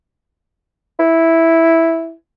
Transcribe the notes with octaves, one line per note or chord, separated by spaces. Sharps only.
E4